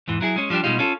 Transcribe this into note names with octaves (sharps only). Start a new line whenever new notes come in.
E2 G#2 E3
F#3 E4 G#4
G#3 C#4
F3 G3 B3 D4 G4
B2 G3 G#3 D#4 F4
C#4 F4 A4